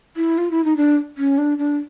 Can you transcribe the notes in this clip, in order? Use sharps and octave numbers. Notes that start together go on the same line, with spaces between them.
E4
F4
E4
D#4
D4
C#4
D4
D4